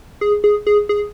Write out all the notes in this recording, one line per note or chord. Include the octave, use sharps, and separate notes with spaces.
G#4
G#4
G#4
G#4